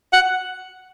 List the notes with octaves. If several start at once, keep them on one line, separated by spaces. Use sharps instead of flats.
F#5